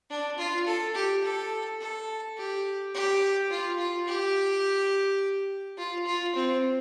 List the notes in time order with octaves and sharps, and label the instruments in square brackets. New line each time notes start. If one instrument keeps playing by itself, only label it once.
[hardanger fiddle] D4
F4
A4
G4
A4
A4
G4
G4
F4
F4
G4
F4
F4
C4